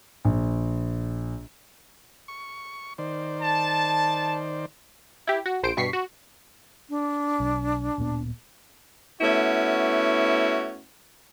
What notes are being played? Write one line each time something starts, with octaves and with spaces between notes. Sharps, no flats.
A#1
C#6
D#3 C5 D5
A5
E4 G4
F#4
A#1 C5 D7
G2 B2 C#6 B6 C7
F#4
D4
B1
D1 A#2 B3
A3 B3 C#4 E4 F#4